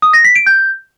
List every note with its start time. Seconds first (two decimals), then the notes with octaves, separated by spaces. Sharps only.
0.02 D#6
0.13 A#6
0.24 B6
0.35 D7
0.46 G6